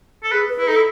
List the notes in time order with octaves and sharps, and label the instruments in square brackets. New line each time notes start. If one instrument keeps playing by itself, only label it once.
[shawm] A4
[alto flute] G#4 [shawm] B4
[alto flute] B4
[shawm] E4
[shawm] D#4 [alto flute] A4
[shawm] E4